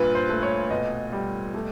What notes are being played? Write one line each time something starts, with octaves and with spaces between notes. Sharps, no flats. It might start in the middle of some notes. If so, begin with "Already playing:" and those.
Already playing: G2 A#2 B4
C5
A3
C#5
B2 D#5
G3
A3